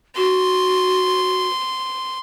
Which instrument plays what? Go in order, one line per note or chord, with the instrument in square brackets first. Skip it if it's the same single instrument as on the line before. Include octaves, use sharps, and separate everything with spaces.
[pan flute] F#4 [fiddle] C6